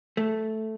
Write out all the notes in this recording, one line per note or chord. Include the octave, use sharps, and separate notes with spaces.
A3